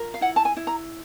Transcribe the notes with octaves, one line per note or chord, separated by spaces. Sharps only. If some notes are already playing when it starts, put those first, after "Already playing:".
Already playing: F4 A#4
F5
E4 F#5
A5
G#5
E4
A#5